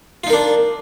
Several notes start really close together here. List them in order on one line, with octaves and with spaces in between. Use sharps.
F4 D#4 A#4 D4